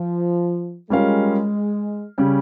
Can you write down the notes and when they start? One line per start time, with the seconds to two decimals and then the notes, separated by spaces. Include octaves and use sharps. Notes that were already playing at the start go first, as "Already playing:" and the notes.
Already playing: F3
0.90 G3 G#3 C#4 F4 A#4 F5
2.18 C#3 G3 C#4